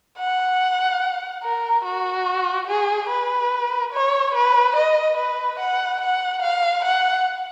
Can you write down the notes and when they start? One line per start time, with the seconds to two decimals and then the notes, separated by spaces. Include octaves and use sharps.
0.18 F#5
1.43 A#4
1.85 F#4
2.67 G#4
3.09 B4
3.93 C#5
4.35 B4
4.76 D#5
5.17 B4
5.59 F#5
6.01 F#5
6.42 F5
6.84 F#5